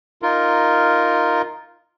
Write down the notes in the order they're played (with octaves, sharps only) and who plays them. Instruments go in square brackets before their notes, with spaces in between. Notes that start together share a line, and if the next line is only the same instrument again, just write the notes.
[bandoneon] D#4 F4 A#4